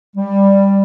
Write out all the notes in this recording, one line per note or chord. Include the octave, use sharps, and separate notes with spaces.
G3